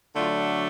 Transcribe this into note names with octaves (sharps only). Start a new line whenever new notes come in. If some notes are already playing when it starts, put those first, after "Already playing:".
D3 F#3 A3 D4 F4